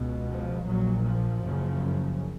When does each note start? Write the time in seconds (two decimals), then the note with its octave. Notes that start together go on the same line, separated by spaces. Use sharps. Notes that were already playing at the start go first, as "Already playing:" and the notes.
Already playing: C#2 B2
0.28 F3
0.66 A#1 A#2 F#3
1.04 F3
1.41 F#1 F#2 C#3